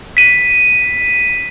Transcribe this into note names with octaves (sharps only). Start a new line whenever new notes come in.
B6 D#7